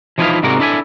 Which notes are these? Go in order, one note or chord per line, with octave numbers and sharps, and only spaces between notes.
E3 F3 D#4 E4 B4 F5
G#2 C3 G#3 F#4 A#4 D5
D4 E4 A4 E5 F5 G#5